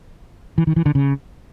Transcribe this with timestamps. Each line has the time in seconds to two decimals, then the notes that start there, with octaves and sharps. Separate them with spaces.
0.58 E3
0.67 D#3
0.76 E3
0.86 D3
0.95 C#3